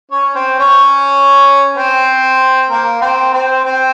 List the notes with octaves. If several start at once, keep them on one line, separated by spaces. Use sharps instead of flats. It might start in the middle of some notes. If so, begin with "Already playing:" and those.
C#4 C#5
C4 C5
C#4 C#5
C4 C5
A#3 A#4
C4 C5
C4 C5
C4 C5